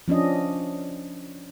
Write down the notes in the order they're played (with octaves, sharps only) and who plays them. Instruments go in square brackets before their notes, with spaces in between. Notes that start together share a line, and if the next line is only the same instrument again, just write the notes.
[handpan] F3 C#4 D4 D#5